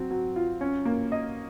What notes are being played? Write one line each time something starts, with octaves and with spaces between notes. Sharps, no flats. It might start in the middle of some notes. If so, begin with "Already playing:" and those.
Already playing: F#3 C4
F#3
F4
C#4
A#3
D#5